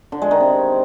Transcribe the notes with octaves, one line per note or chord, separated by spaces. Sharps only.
D3
G#3
D#3
C3